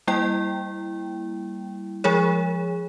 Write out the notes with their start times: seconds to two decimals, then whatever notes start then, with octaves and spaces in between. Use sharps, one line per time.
0.07 G3 A#3 E4 G5
2.04 F3 G#3 G#4 C#5